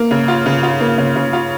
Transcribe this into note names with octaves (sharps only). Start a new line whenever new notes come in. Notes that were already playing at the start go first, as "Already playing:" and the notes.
Already playing: A#3
C#3
F4
C#3
F4
A#3
C#3
C#3
F4